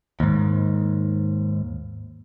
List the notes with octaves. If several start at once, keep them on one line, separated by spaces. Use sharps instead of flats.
D#2 G#2